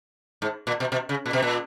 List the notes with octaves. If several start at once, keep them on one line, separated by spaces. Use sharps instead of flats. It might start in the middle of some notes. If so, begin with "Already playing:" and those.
G#2
A#2
B2
B2
C#3
A#2
B2
A#2